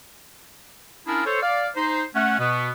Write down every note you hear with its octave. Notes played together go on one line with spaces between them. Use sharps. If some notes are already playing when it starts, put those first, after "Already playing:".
C#4 D4 E4 F4 G#4 A#4
A4 C5 C#5
D5 F5
D#4 C5
A3 C#4 F#5
B2 B3